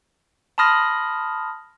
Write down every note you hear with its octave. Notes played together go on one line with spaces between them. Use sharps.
A5 B5 C6 D#6 F6 A#6